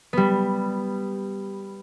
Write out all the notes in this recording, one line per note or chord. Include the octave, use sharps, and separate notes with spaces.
G3 B3